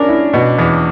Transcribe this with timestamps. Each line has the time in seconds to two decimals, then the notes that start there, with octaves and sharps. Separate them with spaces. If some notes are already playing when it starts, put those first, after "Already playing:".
Already playing: C#4 D4 A#4
0.08 E4
0.33 B2
0.58 E2